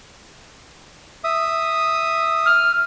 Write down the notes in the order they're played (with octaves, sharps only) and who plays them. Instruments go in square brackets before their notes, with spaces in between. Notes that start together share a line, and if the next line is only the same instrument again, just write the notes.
[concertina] E5 D#6
[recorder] F6